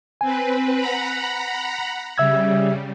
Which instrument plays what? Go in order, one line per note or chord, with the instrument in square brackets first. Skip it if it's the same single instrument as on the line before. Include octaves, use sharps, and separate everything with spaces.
[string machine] C4 B4 [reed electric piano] G#5
[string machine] F#5 A#5 B5
[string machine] C#3 G3 [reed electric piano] E5 E6 G#6